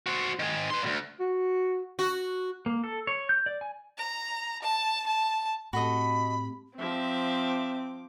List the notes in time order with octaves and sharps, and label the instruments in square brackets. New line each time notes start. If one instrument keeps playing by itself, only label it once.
[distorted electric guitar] F#4 C5
D#3 G#4
B4 C6
D2 G2
[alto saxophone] F#4
[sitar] F#4
[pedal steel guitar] A#3
A4
C#5
G6
D5
G#5
[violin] A#5
A5
A5
[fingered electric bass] A2 [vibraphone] A3 C4 G4 [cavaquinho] F#4 A4 D#5 [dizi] B5
[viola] F3 D6 [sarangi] C4 [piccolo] E5